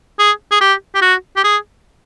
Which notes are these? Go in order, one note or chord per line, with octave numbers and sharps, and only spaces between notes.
G#4
G#4
G4
G4
F#4
G4
G#4